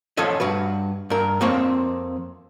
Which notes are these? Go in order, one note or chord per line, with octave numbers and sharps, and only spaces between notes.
F3 C#4 A4 C#5 D#5
G2 F#4 B4
G2 A#4
F2 A#3 C4 C5 C#5